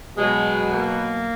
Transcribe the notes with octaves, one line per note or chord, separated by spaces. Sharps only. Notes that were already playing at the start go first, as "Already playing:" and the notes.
B2 F#3 G#3
A#3